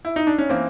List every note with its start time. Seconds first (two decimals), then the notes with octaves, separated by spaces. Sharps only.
0.05 E4
0.16 D#4
0.27 D4
0.38 C#4
0.49 E3 A#3 C4